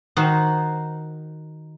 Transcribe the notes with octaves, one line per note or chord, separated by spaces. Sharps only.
D#3 D#4 F#4 C5